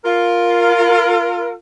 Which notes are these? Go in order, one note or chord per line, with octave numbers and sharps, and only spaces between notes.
F4 A#4